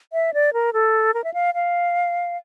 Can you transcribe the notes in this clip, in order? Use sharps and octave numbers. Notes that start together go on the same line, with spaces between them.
E5
D5
A#4
A4
A#4
E5
F5
F5